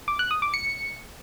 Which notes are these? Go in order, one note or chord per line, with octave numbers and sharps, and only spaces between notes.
D6
F#6
D#6
D6
C#7